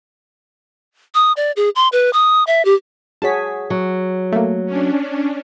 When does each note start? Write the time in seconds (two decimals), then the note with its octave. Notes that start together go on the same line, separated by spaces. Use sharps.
1.15 D#6
1.37 D5
1.56 G#4
1.76 C6
1.92 B4
2.13 D#6
2.47 E5
2.65 G4
3.22 F#4 G#4 C#5 A5 B6
3.70 F#3
4.32 A3 A#3
4.66 C#4 D4